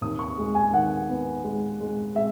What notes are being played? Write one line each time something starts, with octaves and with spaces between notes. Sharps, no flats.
D#2 D#6
C#6
G#3
G#5
D#3 F#5
B3
G#3
G#3
G#3 E5